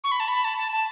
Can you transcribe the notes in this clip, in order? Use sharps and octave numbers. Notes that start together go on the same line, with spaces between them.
C#6
B5
A5
B5
A5
A5
A5